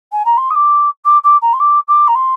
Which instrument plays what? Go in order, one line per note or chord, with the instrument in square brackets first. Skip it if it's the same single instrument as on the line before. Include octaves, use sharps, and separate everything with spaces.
[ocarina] G#5
A#5
C6
D#6
D6
D6
D6
A#5
C6
D6
D6
A#5
C6